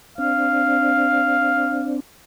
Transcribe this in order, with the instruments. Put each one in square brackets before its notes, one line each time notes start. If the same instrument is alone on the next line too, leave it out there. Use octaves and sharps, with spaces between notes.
[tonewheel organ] C4 D4 [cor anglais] F5